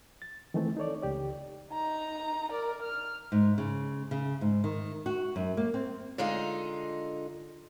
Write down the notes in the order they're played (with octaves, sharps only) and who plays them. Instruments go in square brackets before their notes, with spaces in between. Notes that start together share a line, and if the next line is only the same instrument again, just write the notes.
[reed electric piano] A6
D#3 E3 A3 C4
D#4 A4 C#5 D5
C#2 G4 D5
[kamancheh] D#4 A#5
A#4 D5
F6
[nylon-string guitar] G#2
C#3
C#3
G#2
D#3
F#4
F#2
A#3
C4
[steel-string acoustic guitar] D3 G#3 D#4 F4